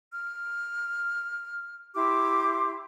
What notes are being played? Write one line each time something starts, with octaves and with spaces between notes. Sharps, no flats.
F6
E4 G4 C6 D6